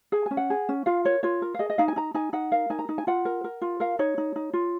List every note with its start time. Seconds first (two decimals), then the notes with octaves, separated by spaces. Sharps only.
0.12 G#4 G#5
0.26 C#4 G#5
0.37 F#5
0.50 G#4
0.69 C#4
0.86 F4 F5
1.05 A#4 C#5
1.23 F4 C#5
1.42 A#4
1.54 F5
1.59 G#4 D#5
1.70 D#5
1.78 D#4 F5
1.88 G#5
1.96 D#4 A#5
2.14 D#4 G#5
2.33 D#4 F#5
2.52 A#4 F5
2.70 D#4 G#5
2.79 A#5
2.89 D#4
2.98 G#5
3.07 F4 F#5
3.25 A#4
3.44 A#4
3.61 F4
3.80 A#4 F5
3.99 D#4 C#5
4.18 D#4
4.36 D#4
4.53 F4